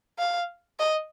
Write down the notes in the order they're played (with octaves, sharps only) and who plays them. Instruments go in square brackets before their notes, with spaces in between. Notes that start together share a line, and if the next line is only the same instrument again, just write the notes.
[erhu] F5
D#5